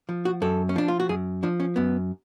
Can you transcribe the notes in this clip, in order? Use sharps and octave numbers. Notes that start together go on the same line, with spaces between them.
F3
F#4
F#2 A4
C#4
F3 D4
F4
F#4
F#2 G#4
F3 D4
C#4
F#2 B3